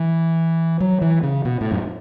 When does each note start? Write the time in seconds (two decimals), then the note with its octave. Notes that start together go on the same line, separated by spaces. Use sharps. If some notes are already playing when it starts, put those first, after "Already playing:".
Already playing: E3
0.80 F#3
1.02 E3
1.23 C#3
1.45 B2
1.61 A2
1.71 F#2